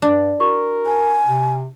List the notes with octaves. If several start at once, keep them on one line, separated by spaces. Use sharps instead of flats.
G2 D4
E4 F#4 A#4 C#6
C5 G#5 A5
C3